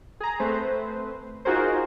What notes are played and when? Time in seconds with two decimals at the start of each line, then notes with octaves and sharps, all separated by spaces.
0.20 G#4 A#5
0.40 A3 C4 B4 C5
1.45 D#4 F4 F#4 G#4 A#4 C5